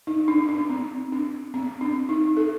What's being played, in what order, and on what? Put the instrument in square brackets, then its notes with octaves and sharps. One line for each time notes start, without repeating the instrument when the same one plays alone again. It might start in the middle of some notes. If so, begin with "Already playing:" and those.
[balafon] D#4
D4
D4
C4
D4
C4
D4
D#4
A4